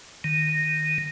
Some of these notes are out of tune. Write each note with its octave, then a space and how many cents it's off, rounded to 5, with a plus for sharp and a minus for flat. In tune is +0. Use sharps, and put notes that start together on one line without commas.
D#3 -10